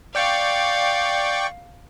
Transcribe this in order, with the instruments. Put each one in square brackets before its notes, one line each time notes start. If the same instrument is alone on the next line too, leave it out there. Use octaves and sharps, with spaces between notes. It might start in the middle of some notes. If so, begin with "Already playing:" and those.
[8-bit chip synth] D5 G5 C#6 [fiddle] F5